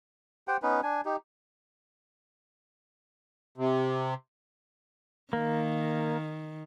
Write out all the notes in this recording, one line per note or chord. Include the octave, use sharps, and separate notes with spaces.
G4 C5 F#5 G5
B3 C#4 D#4 B4
D4 G#5
D#4 G4
C3
D#3 A#3